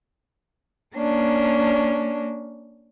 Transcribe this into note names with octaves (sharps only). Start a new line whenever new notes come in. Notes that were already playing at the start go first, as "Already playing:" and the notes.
A#3 C#4 D4